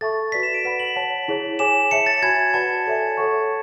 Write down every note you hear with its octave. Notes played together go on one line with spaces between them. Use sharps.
A4 E5 A5 C#6 A6
F#4 B4 D5 B6
E7
D7
B4 F#5 B5
F#7
C#5 F#5 A5
E4 G#4 C#5
G#4 C#5 G#5 D6 E7
C#5 E5 A5 C#7
A6
F#4 C#5 G#5 B5 G#6
F#4 B4 D5 F#5 A5 B5
A4 C#5 E5 G#5
A4 C#5 F#5 C#6